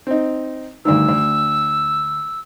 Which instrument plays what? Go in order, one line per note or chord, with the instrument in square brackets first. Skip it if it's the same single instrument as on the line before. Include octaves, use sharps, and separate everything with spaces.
[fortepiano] C4 D#4
[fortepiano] D2 G2 D#3 [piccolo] E6
[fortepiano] D2